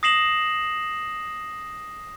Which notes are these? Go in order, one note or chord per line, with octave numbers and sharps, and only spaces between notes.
D#6 A#6 C7 E7 F#7